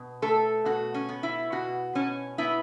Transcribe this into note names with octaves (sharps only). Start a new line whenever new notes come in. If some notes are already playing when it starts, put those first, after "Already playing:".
Already playing: B2
A3 A4
B2 F#4
C#4
B3
E4
B2 F#4
B2 C#4
B3 E4